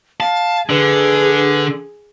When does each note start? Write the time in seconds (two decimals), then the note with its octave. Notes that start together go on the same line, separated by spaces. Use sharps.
0.20 F5 A5
0.70 D3 G#4 B4